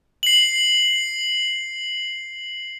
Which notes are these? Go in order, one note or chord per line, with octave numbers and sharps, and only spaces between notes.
C7 F#7